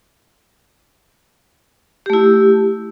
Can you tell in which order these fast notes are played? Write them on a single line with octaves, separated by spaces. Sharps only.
G4 A3 E4